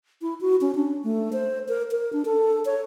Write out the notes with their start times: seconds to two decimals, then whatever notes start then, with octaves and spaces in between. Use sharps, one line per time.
0.22 E4
0.41 F#4
0.61 C#4
0.75 D4
1.04 A3
1.33 C5
1.68 A#4
1.91 A#4
2.13 D4
2.25 A4
2.65 C#5